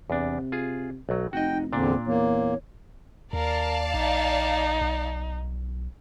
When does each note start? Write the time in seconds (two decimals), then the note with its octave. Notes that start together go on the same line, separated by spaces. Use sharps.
0.10 E2 C3 D4
0.52 F4 G#4
1.09 B1 F#3
1.33 F1 D#4 F#4 D#5 G5
1.73 E2 A#2 D3 C4 D4
2.07 E2 A#3 C#5
3.33 D#2 A#4 D5 F5 A5
3.94 A#1 D#4
4.81 B1